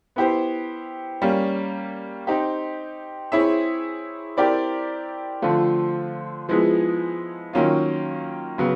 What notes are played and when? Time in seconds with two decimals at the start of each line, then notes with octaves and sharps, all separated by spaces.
0.16 B3 E4 G4 C5
1.22 G3 A#3 C#4
2.27 C4 D#4 G4
3.32 C4 E4 G#4 C#5 E5
4.37 C4 E4 G4 A#4 D5
5.42 D3 F3 A3 C4 F4
6.49 F3 G#3 B3 E4 G#4
7.53 D#3 F#3 A#3 C#4 F4
8.58 C#3 F#3 B3